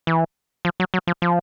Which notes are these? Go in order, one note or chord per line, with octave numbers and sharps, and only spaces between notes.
E3
F3
F#3
F#3
F3
F3